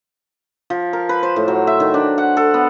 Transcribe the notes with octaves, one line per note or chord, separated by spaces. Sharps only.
F3
A#4
B4
C5
A2
F#3
E5
D#3
D4
F#5
A4
B3